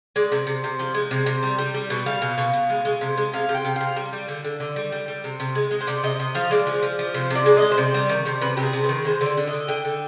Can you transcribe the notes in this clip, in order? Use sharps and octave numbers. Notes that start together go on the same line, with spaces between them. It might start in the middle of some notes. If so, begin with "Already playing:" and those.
G#3 D5
C3
C3
C3
F3
G#3
C3
C3
G3
G3
G3
B2
G3 F5
B2
B2
B2
G#3
G#3
C3
G#3
C3 F5
C3
G5
C3
C3 F5
G3
G3
D3
D3
D3
G3
G3
G3
C3
C3
G#3
G#3
C5
C3 D5
C3 D#5
C3 D#5
F3 F5
G#3 D5
F3
F3
F3
C3 C5
C3
D5
G#3
G#3 D#5
C5
C3 D5
G3
D#3
C3
C3 B4
C3 G4
G#4
C3
D#3 B4
G#3 C5
D3 C5
D5
D3
D#5
D3
D3 G5
D3